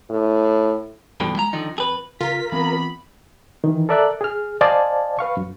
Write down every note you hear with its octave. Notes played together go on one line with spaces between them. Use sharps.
A2
G2 B2 D3 E3 F3
G#3 A#5
D3 D#3 F3 D#4
F2 G#4 B4
C#3 F4 A#4 B6
E3 B3 C4 B5
D#3 E3
A4 A#4 D5 E5 D6 F#6
G#4 F6
C5 D5 D#5 F5 G#5 A5
B4 F5 C#6
F#2